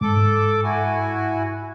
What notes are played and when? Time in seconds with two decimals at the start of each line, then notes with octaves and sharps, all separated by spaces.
0.01 G#2 A4 D6
0.64 E4 F#4 G#5